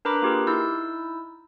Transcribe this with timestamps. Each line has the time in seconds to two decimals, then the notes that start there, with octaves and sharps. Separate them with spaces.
0.05 D4 A#4 B4 A#5 B5 D6
0.22 A#3 F4 G4 G#4 A#4
0.47 D#4 E4 E6 G6